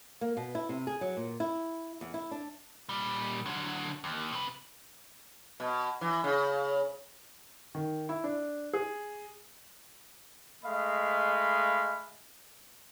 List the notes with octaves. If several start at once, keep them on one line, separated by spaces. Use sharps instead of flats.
A#3
B2
E4
C3
G#4
F#3
A#2
E4
E2
E4
D4
A#2 G3
D3 F#3
D#2
C3 B4
B2
E3
C#3
D#3
E4
D4
G#4
G#3 A3 D#5 F5 B5